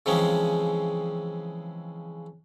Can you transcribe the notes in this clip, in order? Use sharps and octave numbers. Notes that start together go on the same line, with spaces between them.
C#3 E3 F3 G#3 C4 C#4